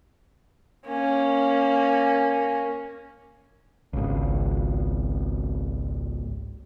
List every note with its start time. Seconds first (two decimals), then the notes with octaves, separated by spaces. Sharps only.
0.86 A#3 C#4
3.93 G#1 C#2